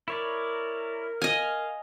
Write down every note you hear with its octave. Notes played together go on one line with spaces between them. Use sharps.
E4 A#4 C#5 D5
D#5 F5 G#5